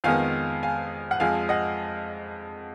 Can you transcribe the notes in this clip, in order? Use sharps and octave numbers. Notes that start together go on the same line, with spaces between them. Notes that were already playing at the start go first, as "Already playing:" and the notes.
F2 D#3 G#3 B3 F5 G#5
F5 G#5
F#5
F2 F3 G#3 F5 G#5
D#5 F#5